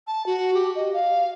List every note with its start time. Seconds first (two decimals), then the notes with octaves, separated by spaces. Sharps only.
0.07 A5
0.26 F#4
0.54 G4
0.75 D#5
0.93 F5